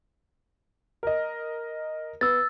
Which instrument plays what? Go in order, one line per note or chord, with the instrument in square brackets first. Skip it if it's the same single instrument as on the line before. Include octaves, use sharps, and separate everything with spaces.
[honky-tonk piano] A#4 D#5
[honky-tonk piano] B3 [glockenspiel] E6 A6